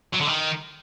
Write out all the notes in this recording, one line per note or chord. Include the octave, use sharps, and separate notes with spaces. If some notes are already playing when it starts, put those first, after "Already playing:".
F#3
D3
D#3